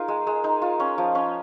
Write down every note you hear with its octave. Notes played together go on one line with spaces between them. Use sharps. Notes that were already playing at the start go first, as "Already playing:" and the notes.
Already playing: D#4 F4 G#4 A#4
G#3
G#3
D#4
F4
C#4
F3
C#4